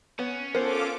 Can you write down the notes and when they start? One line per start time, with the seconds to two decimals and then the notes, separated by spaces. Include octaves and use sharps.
0.19 B3 C#4
0.55 B3 F4 A4 A#4 C5 D6